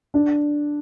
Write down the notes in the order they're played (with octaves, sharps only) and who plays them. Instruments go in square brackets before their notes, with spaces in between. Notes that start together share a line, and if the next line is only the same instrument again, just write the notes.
[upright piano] D4